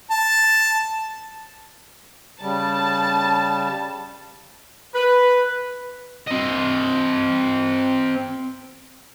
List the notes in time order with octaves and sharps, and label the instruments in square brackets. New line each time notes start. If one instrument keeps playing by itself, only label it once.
[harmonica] A5
[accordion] C#3 G3 [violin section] A5
[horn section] B4
[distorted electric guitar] C4 D#5